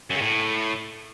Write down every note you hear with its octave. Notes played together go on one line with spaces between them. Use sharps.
F#2
C#3
A2